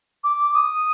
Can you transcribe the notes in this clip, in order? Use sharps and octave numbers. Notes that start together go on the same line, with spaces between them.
D6
D#6